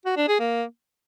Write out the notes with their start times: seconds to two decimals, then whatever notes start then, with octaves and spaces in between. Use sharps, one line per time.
0.05 F#4
0.17 D4
0.28 G#4
0.39 A#3